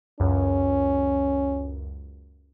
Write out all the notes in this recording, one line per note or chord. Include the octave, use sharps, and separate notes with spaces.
C#2 F#2 C#4